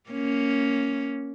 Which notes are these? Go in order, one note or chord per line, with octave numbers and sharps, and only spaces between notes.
A#3 C#4